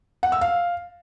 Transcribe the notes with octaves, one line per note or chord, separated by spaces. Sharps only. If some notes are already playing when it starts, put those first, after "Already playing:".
F#5
E6
F5